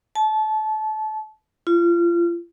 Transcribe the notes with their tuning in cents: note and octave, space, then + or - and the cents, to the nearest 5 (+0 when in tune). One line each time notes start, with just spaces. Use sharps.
A5 -25
F4 -30